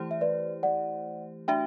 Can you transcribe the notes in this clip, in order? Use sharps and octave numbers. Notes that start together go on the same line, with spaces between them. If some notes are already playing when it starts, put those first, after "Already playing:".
Already playing: E3 A3 E4 G4 C5
E5
B4 D5
D5 F#5
A3 D4 F#4 E5 G5